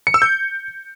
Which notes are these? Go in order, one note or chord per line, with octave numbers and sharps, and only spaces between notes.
C#7
E6
G6